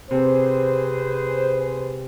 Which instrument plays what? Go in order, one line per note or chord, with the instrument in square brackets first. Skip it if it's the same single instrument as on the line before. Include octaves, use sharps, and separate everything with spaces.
[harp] C3 [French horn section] G#4 B4 C5